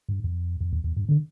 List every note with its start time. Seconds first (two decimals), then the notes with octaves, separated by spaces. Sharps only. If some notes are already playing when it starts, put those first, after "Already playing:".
0.09 G2
0.24 F2
0.61 F2
0.73 E2
0.84 E2
0.97 G2
1.09 D3